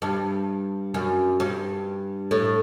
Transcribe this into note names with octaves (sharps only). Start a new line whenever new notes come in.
G2
F#2
G2
A2